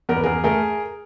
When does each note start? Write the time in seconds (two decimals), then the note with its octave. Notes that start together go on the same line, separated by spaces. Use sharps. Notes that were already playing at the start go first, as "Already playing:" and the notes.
0.09 E2 A#4
0.17 B4
0.24 E2 G#4 A#4
0.44 A3 G#4 A#4